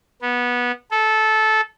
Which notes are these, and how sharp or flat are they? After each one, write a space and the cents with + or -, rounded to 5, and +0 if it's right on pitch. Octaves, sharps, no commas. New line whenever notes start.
B3 -15
A4 -15